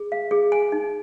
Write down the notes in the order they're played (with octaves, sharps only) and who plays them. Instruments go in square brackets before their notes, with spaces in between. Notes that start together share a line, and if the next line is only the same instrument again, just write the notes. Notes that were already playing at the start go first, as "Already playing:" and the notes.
Already playing: [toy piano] G#4
F5
G#4
G#5
D#4